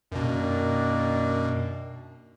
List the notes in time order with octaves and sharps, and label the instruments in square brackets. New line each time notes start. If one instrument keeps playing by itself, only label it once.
[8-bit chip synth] F#2 B2 [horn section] D#3 A#3 D4